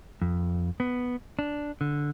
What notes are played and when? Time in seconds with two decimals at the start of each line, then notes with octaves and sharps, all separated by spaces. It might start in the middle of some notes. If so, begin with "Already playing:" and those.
0.22 F2
0.80 B3
1.39 D4
1.81 D3